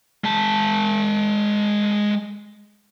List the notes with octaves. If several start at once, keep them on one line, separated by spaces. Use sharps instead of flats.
G#3 A5